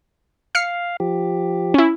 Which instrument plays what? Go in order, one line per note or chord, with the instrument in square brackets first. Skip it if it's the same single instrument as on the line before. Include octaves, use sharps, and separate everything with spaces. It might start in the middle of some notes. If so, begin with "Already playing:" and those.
[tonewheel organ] F5 [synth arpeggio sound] F6 C7 C#7
[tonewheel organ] F3 G4
[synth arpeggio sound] C#4 E4